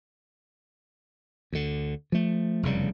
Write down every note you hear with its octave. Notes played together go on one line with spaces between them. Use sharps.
D2 D3
F3 A3
F1 E2 C#3 G3